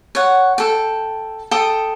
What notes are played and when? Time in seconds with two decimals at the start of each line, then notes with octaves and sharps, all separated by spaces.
0.15 C#5 F#5
0.58 A4 G5
1.51 A4 G5 D#6